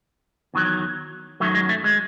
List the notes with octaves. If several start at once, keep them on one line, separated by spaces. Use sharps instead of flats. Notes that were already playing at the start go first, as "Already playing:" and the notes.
E2 D#3 F#3
F#2 D#3 F#3 A3
G#3
A3
G#3